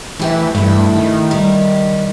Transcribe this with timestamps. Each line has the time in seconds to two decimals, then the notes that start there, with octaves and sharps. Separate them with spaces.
0.19 E3 A3 G4 E5
0.55 G2 A3 E4
0.96 D#3
1.31 G3